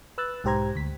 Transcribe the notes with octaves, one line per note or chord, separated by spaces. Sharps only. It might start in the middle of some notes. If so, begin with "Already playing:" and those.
B4 E6 F#6 A6
B1 G#2 G4 C5 A#5 G#6
D2 B6